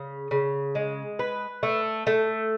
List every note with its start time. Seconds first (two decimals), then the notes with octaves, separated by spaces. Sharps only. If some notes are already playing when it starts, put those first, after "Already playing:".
Already playing: C#3
0.31 C#3
0.75 G#3
1.19 B4
1.63 A3
2.07 A3